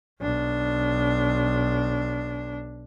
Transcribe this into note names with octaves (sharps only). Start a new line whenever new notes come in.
B1 D4